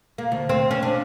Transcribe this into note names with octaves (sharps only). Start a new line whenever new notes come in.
A#3
D2
C4
C#4
D4